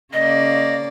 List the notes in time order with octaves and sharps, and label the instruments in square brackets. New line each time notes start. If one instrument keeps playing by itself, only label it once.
[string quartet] C#3 A#3 D5 [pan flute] D#5